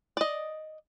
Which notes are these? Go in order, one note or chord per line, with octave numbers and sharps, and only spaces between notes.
D5 D#5